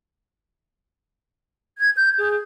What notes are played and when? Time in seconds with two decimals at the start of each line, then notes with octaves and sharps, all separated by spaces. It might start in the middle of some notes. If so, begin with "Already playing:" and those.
1.78 G#6
1.96 G6
2.17 G#4